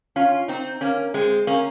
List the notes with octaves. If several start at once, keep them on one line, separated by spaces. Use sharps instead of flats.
C#4 F4
C4 D#4
A#3 C#4
G#3 C4
A#3 C#4